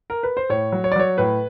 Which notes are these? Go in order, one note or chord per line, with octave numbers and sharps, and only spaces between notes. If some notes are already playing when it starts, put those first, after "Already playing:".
A#4
B4
C5
A2 C#5
F#3
C#5
D5
F#3 C#5
A2 B4